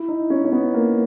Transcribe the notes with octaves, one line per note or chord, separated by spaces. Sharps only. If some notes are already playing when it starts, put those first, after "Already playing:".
Already playing: E4
D#4
C#4
C#4
B3
A#3